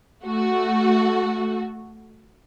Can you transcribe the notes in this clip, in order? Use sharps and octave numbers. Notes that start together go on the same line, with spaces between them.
A3 F#4